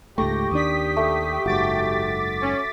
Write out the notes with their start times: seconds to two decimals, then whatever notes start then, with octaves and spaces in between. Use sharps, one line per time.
0.18 C#2 G#2 A3 G4 C#6 A#6
0.51 D#2 D#3 D4 D#6 B6
0.97 A3
1.46 F#1 G#2 F#4 D6 A6 B6
2.42 C#4